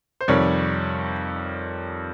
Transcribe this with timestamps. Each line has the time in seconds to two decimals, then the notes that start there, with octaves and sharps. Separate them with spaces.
0.21 C5
0.28 F2 C3 D#3 G3 C#5